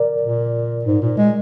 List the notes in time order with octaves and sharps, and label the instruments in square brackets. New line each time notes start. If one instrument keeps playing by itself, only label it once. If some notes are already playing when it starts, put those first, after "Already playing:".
Already playing: [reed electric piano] A#4 D5
[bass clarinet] A#2
G#2
A#2
G#3